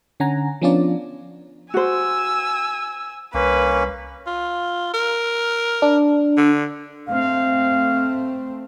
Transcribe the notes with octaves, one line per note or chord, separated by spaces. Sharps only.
D3 C#4 F#5 G#5 A#5
F3 B3 C#4 D4 F4 D5
F#4 C5 G#5 E6
C2 A#3 C#4 B4
F4
A#4
D4
D3
A3 C4 F5